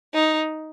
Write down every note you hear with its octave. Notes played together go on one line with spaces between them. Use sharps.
D#4